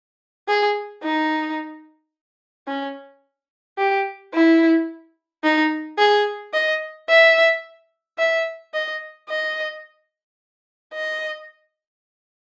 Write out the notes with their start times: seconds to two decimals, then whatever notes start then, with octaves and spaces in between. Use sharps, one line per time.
0.49 G#4
1.04 D#4
2.68 C#4
3.78 G4
4.33 E4
5.44 D#4
5.98 G#4
6.53 D#5
7.09 E5
8.19 E5
8.74 D#5
9.29 D#5
10.94 D#5